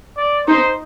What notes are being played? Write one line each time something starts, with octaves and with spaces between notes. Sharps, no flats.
D5
D#4 C5